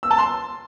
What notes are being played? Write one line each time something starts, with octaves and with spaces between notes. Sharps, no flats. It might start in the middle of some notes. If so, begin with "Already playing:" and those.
E6
A5
C6